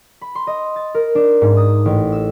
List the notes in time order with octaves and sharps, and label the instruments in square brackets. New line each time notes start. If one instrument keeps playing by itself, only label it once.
[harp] B5
C6
D#5
A6
A#4
D4
G#2
D#6
A1
E6